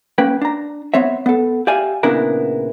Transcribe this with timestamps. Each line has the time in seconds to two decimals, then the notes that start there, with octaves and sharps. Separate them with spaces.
0.18 A#3 C#4 B4 G5
0.42 D4 A#5
0.94 B3 C4 C#5 E5
1.26 B3 A4
1.67 G4 D5 E5 F5 G#5
2.03 A#2 C#3 B3 D4 E4 A#4